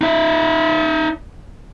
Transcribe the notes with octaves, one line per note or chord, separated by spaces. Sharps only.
D#4 E5